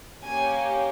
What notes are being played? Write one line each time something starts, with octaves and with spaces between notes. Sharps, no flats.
A#3 C#4 G4 G#5